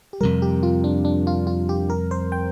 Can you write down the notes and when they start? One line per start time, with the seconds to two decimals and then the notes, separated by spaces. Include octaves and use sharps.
0.13 G4
0.20 F2 C3 G3 A#4
0.42 G4
0.63 F4
0.84 D4
1.05 D4
1.27 F4
1.47 F4
1.69 G4
1.90 A#4
2.11 C5
2.32 G5